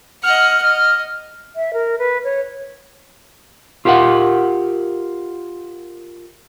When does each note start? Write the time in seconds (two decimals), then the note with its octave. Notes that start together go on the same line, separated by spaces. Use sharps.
0.23 D#5 F#5 F6
0.62 D#5
1.56 E5
1.73 A#4
1.99 B4
2.24 C#5
3.85 F4 G4 A#4 F5 F#5